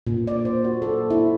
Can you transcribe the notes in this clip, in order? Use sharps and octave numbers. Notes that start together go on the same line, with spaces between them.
A#2
D5
C5
F#4
A4
E4